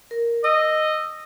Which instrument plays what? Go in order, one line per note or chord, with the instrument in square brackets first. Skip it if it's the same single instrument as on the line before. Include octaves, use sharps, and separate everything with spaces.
[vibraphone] A#4
[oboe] D#5 [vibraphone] E6